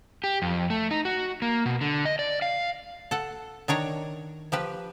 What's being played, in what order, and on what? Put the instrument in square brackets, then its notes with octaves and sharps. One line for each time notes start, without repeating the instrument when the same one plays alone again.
[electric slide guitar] G4
F2
A3
D#4
F#4
A#3
B2
D3
D#5
D5
F5
[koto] A4 F#5
D#3 D4 C#5 A#5
F3 G4 B4